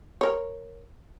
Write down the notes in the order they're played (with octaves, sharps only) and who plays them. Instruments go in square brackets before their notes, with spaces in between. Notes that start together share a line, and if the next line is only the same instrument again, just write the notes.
[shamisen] A#4 C#5